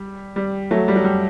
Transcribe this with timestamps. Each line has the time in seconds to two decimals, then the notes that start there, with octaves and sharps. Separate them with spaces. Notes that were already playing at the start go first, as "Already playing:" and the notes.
Already playing: G3
0.36 G3
0.71 F#3 A3
0.88 G3
0.96 F#3
1.04 G3